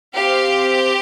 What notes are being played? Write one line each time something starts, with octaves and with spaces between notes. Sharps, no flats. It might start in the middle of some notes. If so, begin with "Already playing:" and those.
C4 G4 F5